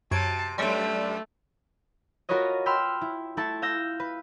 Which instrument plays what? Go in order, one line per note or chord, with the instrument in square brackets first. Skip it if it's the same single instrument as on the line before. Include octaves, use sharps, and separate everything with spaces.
[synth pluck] F#2 G#6 D7 [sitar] C3 [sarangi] A5
[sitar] F#2 G3 [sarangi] A3 [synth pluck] C#5 C6
[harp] F4 F#4 A#4 B4 C#5 D#5
G5 B5 C6 E6 F6
E4
A3 E4 A4 A5
F5 E6 G6 A#6
B4